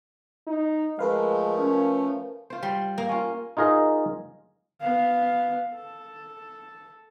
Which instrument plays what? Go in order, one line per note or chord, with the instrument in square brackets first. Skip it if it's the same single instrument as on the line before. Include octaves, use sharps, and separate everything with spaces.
[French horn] D#4
[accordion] F3 A3 [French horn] G#3 [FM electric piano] A#4 B4 F5
[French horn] C#4
[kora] F4 C5
[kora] G3 [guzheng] C6
[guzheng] A#3
[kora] C#4 F4
[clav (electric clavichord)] D#4 F4 G#4 A#4 D#5
[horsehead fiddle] B3 F5
A4